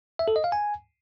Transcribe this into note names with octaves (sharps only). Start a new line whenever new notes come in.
E5
A4
D#5
F5
G#5